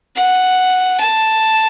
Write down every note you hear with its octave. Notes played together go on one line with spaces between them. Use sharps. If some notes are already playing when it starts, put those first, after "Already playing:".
F#5
A5